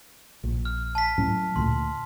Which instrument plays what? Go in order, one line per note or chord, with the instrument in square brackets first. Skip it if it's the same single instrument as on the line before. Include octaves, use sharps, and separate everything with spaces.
[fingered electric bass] A#1
[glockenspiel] F6
A5 B6
[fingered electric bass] A2 F#3 C#4
[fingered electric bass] D2 A#2 [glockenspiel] C6